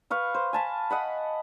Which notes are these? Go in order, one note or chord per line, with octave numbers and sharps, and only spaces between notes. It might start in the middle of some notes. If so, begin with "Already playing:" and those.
B4 F5 C#6
C5
G#5 A5 B5
D#5 F#5 B5